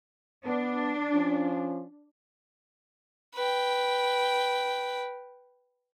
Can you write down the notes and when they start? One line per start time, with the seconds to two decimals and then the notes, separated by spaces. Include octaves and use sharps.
0.45 B3 D4
1.13 F3 C#4
3.35 B4 G5